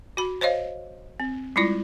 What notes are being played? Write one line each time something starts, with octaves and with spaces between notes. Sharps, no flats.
F#4 B5
C5 C#5 D#5 F5
C4
G3 G#3 E4 F4 D5